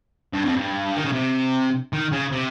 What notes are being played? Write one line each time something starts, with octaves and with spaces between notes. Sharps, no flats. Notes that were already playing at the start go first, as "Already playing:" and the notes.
G2
F2
G2
D#3
C#3
C3
D#3
C#3
C3